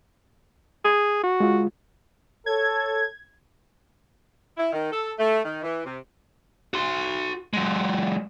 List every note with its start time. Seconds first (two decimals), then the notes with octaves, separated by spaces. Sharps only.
0.84 G#4
1.23 F#4
1.40 G#3 F4
2.46 A4 C#5 G#6
4.57 E4
4.71 D#3
4.91 A4
5.18 A3
5.43 D#3
5.63 E3
5.85 C3
6.74 F#4 C6
7.53 F#3 G#3